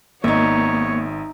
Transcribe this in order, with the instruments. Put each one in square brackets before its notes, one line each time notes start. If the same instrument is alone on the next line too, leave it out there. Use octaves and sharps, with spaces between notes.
[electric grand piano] G#1 [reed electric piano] A#3 [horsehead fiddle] B3 C#5 [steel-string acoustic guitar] D#4 E5